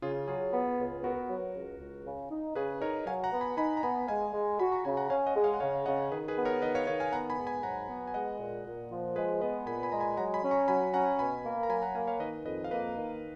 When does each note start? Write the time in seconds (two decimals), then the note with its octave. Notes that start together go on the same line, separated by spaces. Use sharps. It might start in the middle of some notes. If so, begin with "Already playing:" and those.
0.02 C#3 F4 G#4
0.28 F#3 F4 G#4
0.53 B3
0.79 C#2
1.04 B3 F#4 A#4
1.29 F#3
1.55 C#2
1.80 C#2
2.05 C#3
2.31 D#4
2.55 C#3 G#4 B4
2.82 D#4 A#4 C#5
3.07 F#3 F5 G#5
3.24 F#5 A#5
3.32 B3
3.41 G#5 B5
3.57 D#4 G#5 B5
3.77 A#5
3.83 B3 G#5 B5
4.08 G#3 F5 G#5
4.33 G#3
4.59 F#4 G#5 B5
4.72 A#5 C#6
4.84 C#3 G#5 B5
4.97 F#5 A#5
5.10 C#4 F5 G#5
5.27 D#5 F#5
5.35 G#3
5.44 C#5 F5
5.54 F#5
5.60 C#3 C#5 F5
5.86 C#3 D#5 F#5
6.11 D#3 G#4 B4
6.28 G#4 B4
6.37 B3
6.45 A#4 C#5
6.62 D#3 B4 D#5
6.75 C#5 F5
6.87 D#3 C#5 F5
7.00 F5 G#5
7.13 B3 F#5 A#5
7.30 G#5 B5
7.38 G#2
7.47 G#5 B5
7.63 F#3 F#5 A#5
7.89 B3
8.07 G#5
8.14 G#3 D#5 F#5
8.39 A#2
8.65 A#2
8.90 F3
9.16 G#3 G#4 B4
9.41 B3 B4 D#5
9.67 A#2 G#5 B5
9.83 G#5 B5
9.92 G#3 A#5
10.00 G#5 B5
10.17 F#3 F#5 A#5
10.34 G#5 B5
10.43 C#4
10.51 A#5 C#6
10.68 F#3 G#5 B5
10.94 C#4 F#5 A#5
11.19 B2 G#5 B5
11.44 A#3
11.63 A#5
11.69 F#3 G#5 B5
11.82 F#5 A#5
11.95 A#3 F5 G#5
12.07 C#5 F5
12.20 D#3 B4 D#5
12.45 F2 B4 D#5
12.64 F5
12.71 A#3 B4 D#5
12.97 D#3